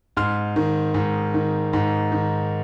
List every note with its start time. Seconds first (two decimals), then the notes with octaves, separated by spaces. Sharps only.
0.17 G#2 C6 F6
0.56 D#3
0.94 G#2
1.34 D#3
1.73 G#2
2.12 D#3